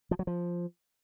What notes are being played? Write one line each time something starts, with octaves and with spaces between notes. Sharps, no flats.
F3
F#3
F3